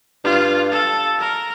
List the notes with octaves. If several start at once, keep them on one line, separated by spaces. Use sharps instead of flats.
G2 F4
A4
A#4